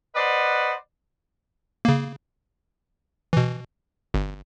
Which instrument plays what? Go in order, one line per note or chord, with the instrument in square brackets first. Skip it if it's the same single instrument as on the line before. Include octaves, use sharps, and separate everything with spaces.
[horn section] B4 C5 D5 D#5 F#5
[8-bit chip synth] C#3 A#3
B2 E3
G1